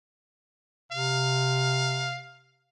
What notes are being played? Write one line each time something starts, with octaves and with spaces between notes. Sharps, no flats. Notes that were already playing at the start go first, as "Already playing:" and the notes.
C3 F5